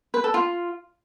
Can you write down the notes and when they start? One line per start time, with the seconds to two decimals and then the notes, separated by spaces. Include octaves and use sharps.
0.14 B4
0.24 A4
0.34 F4